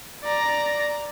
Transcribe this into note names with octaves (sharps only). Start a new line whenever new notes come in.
D5 A#5